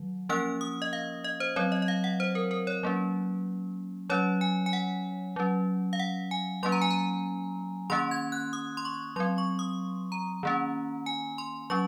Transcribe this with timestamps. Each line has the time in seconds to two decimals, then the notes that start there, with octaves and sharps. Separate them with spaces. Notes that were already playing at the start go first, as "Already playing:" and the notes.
Already playing: D#3 F#3
0.29 F3 A#3 C#4 F6
0.61 D#6
0.82 D#5
0.93 F5
1.24 D#5
1.40 C5
1.56 F#3 C4 C#5
1.72 D#5
1.82 D#5
1.88 F5
2.04 F#5
2.20 C5
2.35 A#4
2.51 A#4
2.67 C#5
2.83 F#3 A#3 C#4
4.09 F#3 C#4 C#5
4.41 G#5
4.66 G#5
4.73 F#5
5.36 F#3 C#4
5.93 F5
5.99 F#5
6.31 G#5
6.63 F#3 A#3 C#4 C6
6.72 A#5
6.82 G#5
6.90 A#5
7.90 D#3 A#3 C#4 C6
8.11 G#6
8.32 F#6
8.53 D#6
8.77 C6
8.85 C#6
9.16 F#3 C4 C6
9.38 C#6
9.59 D#6
10.12 A#5
10.43 D#3 A#3 C#4
11.06 G#5
11.38 C6
11.70 F#3 C#4 C#6